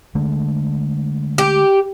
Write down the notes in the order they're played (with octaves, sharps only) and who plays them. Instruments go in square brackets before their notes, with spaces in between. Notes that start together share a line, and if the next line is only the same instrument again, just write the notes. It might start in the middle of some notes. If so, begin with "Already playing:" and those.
[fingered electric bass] D3 G#3 A3
[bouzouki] G4